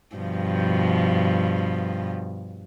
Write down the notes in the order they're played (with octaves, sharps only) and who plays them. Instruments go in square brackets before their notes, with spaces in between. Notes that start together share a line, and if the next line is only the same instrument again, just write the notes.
[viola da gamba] G2 B2 F3